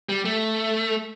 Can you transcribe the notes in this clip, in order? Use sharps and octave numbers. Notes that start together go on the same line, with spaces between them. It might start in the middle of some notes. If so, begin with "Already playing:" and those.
G3
A3